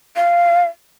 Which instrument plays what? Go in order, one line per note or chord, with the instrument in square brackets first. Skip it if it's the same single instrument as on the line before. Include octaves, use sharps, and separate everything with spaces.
[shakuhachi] F5